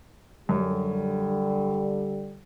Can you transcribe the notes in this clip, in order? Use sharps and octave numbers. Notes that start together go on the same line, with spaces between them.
F#2 D3 G3